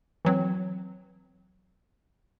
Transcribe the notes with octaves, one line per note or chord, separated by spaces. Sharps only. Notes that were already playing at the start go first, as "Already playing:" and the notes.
E3 F#3 C4